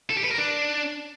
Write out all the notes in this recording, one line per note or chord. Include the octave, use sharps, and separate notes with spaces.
A4
G4
B4
A#4
D4